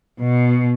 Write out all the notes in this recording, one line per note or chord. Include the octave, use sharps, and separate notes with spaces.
B2